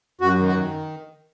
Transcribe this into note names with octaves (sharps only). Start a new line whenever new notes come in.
F#2 F#4
D#3
F#4
D#3